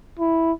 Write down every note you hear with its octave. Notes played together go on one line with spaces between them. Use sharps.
E4